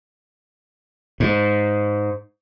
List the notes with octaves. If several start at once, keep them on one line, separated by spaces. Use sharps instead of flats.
G#2